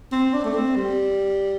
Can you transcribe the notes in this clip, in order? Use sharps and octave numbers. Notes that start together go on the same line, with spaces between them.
C4
D4
A3
C4
G3